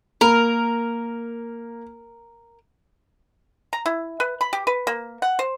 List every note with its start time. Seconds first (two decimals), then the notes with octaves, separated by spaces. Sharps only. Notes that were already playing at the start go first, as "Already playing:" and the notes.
0.21 A#3 A#4
3.73 A#5
3.86 E4
4.20 B4
4.41 B5
4.53 G4
4.67 B4
4.87 A#3
5.22 F#5
5.39 C5